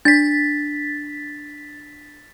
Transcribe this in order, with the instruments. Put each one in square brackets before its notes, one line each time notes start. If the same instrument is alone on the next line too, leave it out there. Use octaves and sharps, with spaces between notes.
[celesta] D4 [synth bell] A6 B6